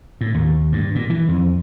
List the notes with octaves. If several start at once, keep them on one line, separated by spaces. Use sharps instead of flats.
A2
D#2
G2
A#2
E3
F2